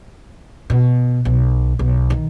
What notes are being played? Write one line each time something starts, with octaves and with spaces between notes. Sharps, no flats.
B2
B1
B1
D#3